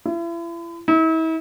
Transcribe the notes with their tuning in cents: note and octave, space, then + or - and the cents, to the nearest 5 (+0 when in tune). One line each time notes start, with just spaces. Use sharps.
E4 +40
E4 -40